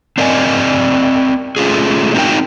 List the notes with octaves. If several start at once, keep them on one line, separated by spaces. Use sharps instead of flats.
C4 D4 A#4 D5 D#5 G#5
A3 C#4 F4 G#4
C4 D#4 F#4 G4 A#4 G5